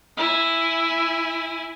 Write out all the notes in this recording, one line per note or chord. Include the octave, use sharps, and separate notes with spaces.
E4 G#5